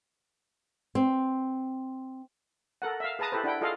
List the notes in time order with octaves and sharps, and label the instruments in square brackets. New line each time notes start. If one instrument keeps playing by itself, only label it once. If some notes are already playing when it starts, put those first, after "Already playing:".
[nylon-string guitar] C4
[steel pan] A4 A#4 F#5
E5 F5
G#4 B4 A5 A#5 D#6
E4 G4 A4 B4 C5
D4 E4 F#5 G5
F4 G#4 A4 D#5 F5